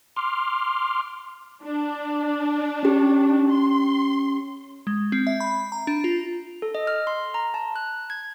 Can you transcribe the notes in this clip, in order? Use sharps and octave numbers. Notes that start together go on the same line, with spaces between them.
C6 D6 F6
D4
C#4 G4
C6
G#3
C4
E5
B5
A#5
D4
F4
A4
D#5
F6
C6
A#5
A5
F#6
G#6